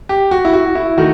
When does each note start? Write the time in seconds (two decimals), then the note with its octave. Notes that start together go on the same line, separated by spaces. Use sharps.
0.09 G4
0.31 F#4
0.45 E4
0.53 F#4
0.75 E4
0.98 D#3 A3 F#4